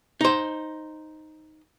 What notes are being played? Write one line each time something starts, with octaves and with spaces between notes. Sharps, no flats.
D#4 C5